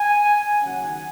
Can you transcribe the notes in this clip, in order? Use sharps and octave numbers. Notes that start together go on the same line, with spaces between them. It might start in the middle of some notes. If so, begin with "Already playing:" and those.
Already playing: G#5
D#2 C#3 F#3 C#4 F#5